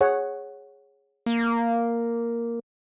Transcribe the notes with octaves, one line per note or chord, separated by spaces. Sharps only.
G#4 C#5 F#5
A#3